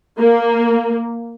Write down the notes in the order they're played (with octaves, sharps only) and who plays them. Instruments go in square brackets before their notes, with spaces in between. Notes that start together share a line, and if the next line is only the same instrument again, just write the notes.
[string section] A#3